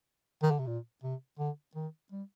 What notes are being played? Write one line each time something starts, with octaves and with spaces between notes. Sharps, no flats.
D#3
D3
C3
A#2
C3
D3
D#3
G3